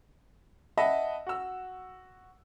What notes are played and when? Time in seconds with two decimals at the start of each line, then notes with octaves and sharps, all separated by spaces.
0.77 D#5 E5 F#5 A5 B5
1.27 F#4 E6